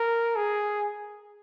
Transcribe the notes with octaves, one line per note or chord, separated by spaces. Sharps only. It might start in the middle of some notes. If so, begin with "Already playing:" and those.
Already playing: A#4
G#4